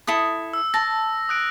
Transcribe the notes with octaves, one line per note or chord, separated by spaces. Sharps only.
E4 A4 D#6
E6
A5 A#6
D#6 F#6 D7